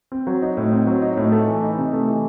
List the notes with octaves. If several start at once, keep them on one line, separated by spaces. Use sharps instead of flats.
C4
F#3
D#4
A2
C4
F#3
D#4
A2
A3
E3
D#4
C3
A3
E3